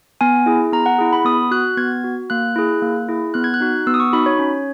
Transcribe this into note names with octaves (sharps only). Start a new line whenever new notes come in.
B3 G#5
E4 G#4
B3 A#5
F#5
E4 G#4
B5
B3 D#6
F#4 F#6
B3 G#6
F#4
A#3 F#6
E4 G#4
A#3
E4 G#4
B3 F#6
G#6
F#6
D#4 F#4
B3 E6
D#6
C#6
D#4 F#4 B5
C#5
C#4